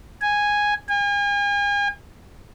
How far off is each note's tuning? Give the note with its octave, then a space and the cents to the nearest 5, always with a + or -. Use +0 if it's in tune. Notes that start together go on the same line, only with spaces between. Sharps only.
G#5 -5
G#5 -40